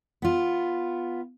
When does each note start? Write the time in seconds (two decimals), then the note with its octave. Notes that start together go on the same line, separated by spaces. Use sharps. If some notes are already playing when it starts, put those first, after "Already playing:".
0.22 B3 F4